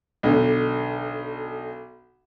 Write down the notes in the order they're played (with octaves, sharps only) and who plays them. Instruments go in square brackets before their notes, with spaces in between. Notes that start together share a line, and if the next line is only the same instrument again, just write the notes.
[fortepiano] B1 D3